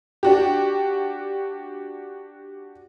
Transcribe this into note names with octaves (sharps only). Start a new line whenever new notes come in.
D4 F#4 G4